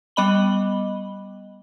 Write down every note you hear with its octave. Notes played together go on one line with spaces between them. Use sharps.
G3 B3 D#5 B5 F#7 G7